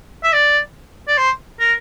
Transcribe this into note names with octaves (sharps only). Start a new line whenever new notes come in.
E5
D5
D5
C5
A#4